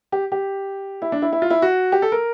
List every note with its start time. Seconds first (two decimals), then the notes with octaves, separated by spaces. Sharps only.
0.12 G4
0.32 G4
1.02 E4
1.12 D4
1.22 E4
1.33 E4
1.42 F4
1.50 E4
1.62 F#4
1.92 G4
2.02 A4
2.12 A#4